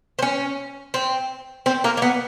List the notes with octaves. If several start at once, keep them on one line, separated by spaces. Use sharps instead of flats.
C4
C#4
C4
C4
A#3
A#3
B3